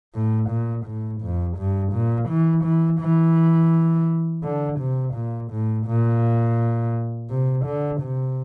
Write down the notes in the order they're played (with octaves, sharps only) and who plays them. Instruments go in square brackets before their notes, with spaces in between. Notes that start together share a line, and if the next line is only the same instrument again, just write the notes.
[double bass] A2
A#2
A2
F2
G2
A#2
E3
E3
E3
D3
C3
A#2
A2
A#2
C3
D3
C3